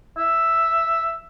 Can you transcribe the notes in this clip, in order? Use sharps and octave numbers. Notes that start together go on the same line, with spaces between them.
E5